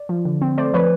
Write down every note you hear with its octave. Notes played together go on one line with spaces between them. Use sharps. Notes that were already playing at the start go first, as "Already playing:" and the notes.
Already playing: D5
F3
D3
C4
A3 C5 D5
F3 B4 C#5